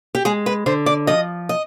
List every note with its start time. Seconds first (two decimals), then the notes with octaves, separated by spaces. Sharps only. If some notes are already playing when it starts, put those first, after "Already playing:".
0.15 G4
0.25 G#3 G#4
0.46 B4
0.66 D3 C5
0.86 D5
1.07 F3 D#5
1.49 D#5